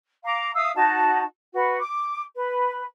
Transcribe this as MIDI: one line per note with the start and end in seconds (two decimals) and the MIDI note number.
0.24 0.52 77
0.24 0.52 82
0.24 0.52 86
0.54 0.71 76
0.54 0.71 77
0.54 0.71 87
0.54 0.71 88
0.75 1.24 63
0.75 1.24 66
0.75 1.24 81
1.54 1.78 66
1.54 1.78 71
1.79 2.23 86
2.35 2.84 71